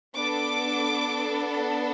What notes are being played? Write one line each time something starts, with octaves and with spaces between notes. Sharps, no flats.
B3 D4 A4 D6